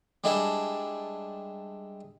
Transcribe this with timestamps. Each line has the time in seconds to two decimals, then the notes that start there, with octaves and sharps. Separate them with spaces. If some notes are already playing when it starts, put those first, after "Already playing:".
0.24 G3 G#3 D4 E4 A4